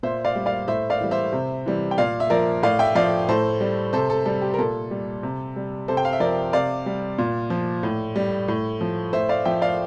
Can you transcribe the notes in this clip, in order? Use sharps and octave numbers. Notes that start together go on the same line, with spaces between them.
A#2 C5 E5
D5 F5
G3
D5 F5
A2 C5 E5
D5 F5
E3 G3
C5 E5
C3
E3 G3
G5
A#2 D5 F5
E5
F3 A#4 D5
A2 D5 F5
E5 G5
F3 D5 F5
A2 A4 C5
G3
C3 A4 C5
A4
G3 A4
G4
A#4
A#2 A4
G3
C3
G3
C3 A4 C5
G5
F5
E5
F3 A#4 D5
C3 D5 F5
G3
A#2
F3
A2
G3
A2
F3
A2 C5 E5
D5 F5
F3 E5 G5
D5 F5